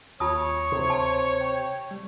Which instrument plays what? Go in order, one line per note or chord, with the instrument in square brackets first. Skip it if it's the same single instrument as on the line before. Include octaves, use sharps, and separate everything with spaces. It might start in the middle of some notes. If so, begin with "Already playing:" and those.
[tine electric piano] D#2 [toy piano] F4 A5 D#6 [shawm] C#5
[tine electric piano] D2 C6 [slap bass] C3
[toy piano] A5
[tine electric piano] G5
G3